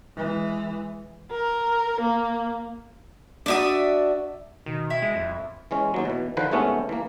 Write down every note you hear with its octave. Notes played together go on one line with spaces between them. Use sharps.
E3 G#3
A#4
A#3
D4 F#4 D5 E5 D#6
B2 D#3
E4
G#3
D#1 F2
E3 G#3 C#4
D#2 F#3
B2 E3
D3 D#3 F3 B4 C5
G#2 C3 A3 B3 C#4
E3 A#3